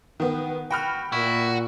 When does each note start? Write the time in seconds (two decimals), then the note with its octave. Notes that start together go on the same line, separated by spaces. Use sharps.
0.20 D#3 B3
0.70 F#4 G5 B5 F6
1.12 A#2 E4 F#4